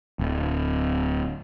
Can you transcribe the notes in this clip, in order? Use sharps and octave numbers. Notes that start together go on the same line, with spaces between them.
D1